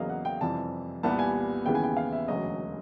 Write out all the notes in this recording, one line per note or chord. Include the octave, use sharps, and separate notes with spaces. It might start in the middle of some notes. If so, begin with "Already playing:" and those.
Already playing: E2 C#3 F#3 A#3 D#5 F5
F#5
G5
F2 C3 E3 G3 A5
C2 A#2 G3 B3 A5
G#5
D#2 C#3 E3 G#3 B3 G5
G#5
G5
F5
E5
E1 D2 C#3 F#3 D#5